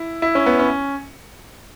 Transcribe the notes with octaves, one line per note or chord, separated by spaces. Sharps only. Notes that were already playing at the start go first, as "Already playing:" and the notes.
Already playing: E4
E4
C#4
B3
C#4